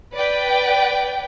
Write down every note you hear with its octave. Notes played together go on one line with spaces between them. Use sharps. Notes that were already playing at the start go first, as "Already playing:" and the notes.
B4 D5 G5